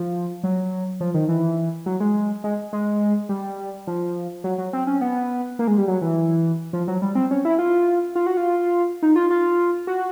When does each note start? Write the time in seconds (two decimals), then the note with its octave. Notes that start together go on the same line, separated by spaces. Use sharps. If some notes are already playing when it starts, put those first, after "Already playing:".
Already playing: F3
0.44 F#3
1.01 F3
1.14 D#3
1.29 E3
1.86 F#3
2.00 G#3
2.44 G#3
2.73 G#3
3.29 G3
3.87 F3
4.44 F#3
4.58 F#3
4.73 C4
4.87 C#4
5.01 B3
5.59 A#3
5.67 G#3
5.78 G3
5.88 F#3
6.02 E3
6.73 F3
6.88 F#3
7.02 G3
7.15 C4
7.31 C#4
7.45 E4
7.59 F4
8.15 F4
8.27 F#4
8.37 F4
9.03 D#4
9.16 F4
9.30 F4
9.87 F#4